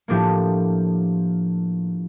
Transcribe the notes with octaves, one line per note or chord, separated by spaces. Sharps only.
A2 F3 A#3 D4 G4